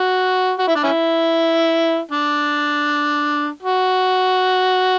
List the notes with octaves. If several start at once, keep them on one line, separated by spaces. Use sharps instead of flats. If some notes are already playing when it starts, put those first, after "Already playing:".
Already playing: F#4
F#4
E4
D4
C#4 E4
D4
F#4